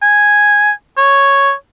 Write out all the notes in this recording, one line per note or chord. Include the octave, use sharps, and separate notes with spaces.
G#5
C#5